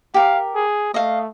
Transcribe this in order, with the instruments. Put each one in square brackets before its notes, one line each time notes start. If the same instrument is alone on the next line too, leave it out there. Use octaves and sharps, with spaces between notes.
[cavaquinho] G4 A#4 [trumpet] F5
[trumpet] G#4
[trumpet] A3 [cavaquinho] D#5 F5